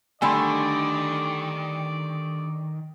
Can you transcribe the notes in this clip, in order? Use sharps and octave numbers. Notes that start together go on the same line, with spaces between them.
D3 D#3 G3 A3 D5 G#5 B5 C6